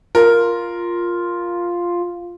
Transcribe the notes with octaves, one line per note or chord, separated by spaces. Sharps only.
F4 A#4